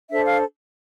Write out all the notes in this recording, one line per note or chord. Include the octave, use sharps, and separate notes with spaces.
D4 A4 C5 E5
F5